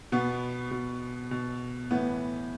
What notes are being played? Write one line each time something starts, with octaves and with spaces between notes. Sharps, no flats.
B2 B3
B2
B2
A2 E3 B3